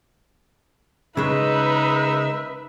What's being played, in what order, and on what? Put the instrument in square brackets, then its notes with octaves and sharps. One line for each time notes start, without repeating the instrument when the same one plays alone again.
[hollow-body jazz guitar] C#3 G#3 [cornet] D#4 [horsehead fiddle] B4 [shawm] E5